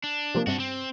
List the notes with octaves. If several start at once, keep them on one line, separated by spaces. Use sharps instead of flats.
D4
C3 F3 A#3
G2 C3 D4 F#4
C4